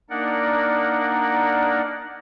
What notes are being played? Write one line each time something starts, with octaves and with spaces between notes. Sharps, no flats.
A#3 D4 D#4 A#4 D5 F#5